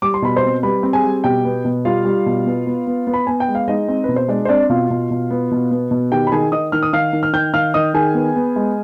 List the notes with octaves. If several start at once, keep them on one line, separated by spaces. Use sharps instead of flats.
G3 D6
C6
B2 B5
C5 C6
C4
G3 B4 B5
C4
G#4 G#5
G3
B2 G4 G5
B3
B2
G3 F4 F5
G3
B2
B3
B3
B3
B3
B5
B3 G#5
G5
G#3
F5
G#3 D#4 D#5
C4
B2 B4
C5
G#3 D4 D5
C5
C4 D4 D5
B2 F4 F5
B2
B2
B3
B2
B3
B2
D#3 G4 G5
B5
D#3 G#4 G#5
D#3 D#5 D#6
D#3 F6
D#6
D#3 F5 F6
D#3
F6
D#3 G5 G6
D#3 F5 F6
D#3 D#5 D#6
D#3 G#4 G#5
B3
B3
G#3